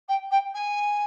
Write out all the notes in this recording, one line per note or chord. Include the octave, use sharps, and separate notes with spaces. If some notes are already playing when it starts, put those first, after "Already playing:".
G5
G5
G#5